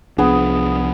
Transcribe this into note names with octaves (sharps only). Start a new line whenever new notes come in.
C2 F3 B3 D4 G#4